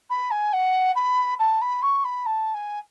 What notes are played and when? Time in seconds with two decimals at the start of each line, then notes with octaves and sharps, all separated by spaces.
0.09 B5
0.30 G#5
0.52 F#5
0.95 B5
1.39 A5
1.61 B5
1.82 C#6
2.04 B5
2.25 A5
2.54 G#5